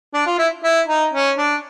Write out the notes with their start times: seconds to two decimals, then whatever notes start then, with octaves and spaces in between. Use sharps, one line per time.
0.14 D4
0.26 F4
0.38 E4
0.63 E4
0.87 D#4
1.13 C#4
1.38 D4